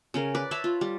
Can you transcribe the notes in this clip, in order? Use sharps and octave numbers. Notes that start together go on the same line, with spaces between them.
C#3 C#4 A#4
B4 D5
C#5 E5 A5 B5
F4
G3